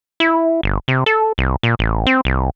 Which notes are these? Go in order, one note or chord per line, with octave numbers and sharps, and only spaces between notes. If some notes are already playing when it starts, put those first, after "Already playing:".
E4
G1
C3
A4
C2
A#2
A1
C4
C2